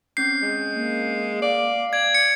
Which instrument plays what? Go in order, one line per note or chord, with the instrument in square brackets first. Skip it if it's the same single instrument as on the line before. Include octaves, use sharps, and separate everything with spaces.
[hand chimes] C4 C#4 G6 [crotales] C7
[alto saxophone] G#3
[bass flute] A#3
[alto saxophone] D5 [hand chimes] F5 D6
[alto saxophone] D5 [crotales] G#6
[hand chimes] A6 [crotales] C#7